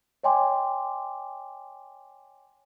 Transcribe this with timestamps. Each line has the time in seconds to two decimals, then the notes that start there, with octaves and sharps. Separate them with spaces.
0.23 C#5 D#5 G5 G#5 C6 D6